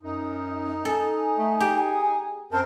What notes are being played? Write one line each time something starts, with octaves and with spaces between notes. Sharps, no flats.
F#2 D#4
A4 G#5
A3
G4 G#4
F#2 C4 A#4 C5 A5